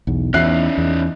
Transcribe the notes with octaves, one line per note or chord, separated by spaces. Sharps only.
B1 E2
E2 C#4 D#4 E5 F#6 C7
E2